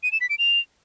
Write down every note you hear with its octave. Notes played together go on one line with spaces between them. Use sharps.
D#7
E7
B6
D7
F7